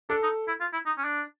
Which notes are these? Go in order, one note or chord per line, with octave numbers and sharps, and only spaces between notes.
D4 A4
D#4
E4
F4
E4
D#4
C#4
D4